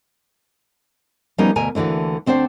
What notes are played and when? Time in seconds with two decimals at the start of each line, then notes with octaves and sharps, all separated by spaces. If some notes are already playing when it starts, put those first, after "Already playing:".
1.38 F3 G3 A#3 B3 C#4 D#4
1.56 D2 B2 A#4 G#5
1.75 D2 D3 E3 A#3 F#4
2.26 D2 C4 D4 C5 F#5